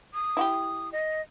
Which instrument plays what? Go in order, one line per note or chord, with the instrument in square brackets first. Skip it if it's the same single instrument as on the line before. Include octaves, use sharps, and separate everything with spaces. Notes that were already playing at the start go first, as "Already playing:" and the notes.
[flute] D#6
[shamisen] E4 F#4 G4
[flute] D#5